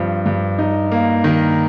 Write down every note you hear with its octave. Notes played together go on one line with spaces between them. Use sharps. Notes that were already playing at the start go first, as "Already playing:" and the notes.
Already playing: G2 F3 C4
G2
D#4
A#3
D#3